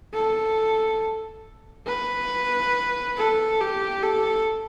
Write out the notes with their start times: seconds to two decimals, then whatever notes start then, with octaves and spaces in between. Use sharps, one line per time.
0.14 A4
1.87 B4
3.17 A4
3.61 G4
4.03 A4